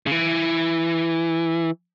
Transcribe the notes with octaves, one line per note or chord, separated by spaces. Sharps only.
C#3
E3